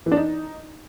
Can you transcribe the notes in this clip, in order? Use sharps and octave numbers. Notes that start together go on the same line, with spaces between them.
E3
D4
D#4